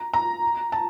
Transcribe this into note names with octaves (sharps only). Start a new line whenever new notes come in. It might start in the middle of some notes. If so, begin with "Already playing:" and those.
Already playing: A#5
A#5
A5